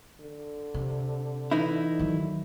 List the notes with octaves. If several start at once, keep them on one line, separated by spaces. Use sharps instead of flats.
D3
C3
E3 D#4 E4
D#3 F#3